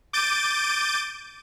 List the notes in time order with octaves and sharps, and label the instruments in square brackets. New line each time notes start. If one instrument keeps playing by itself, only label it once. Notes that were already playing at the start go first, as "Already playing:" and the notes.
[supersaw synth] D6 G6 A6 D7 D#7